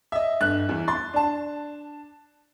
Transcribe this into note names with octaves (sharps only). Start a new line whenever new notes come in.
D#5 E5
G1 F#6
E2 E3
C6 A6
D4 A5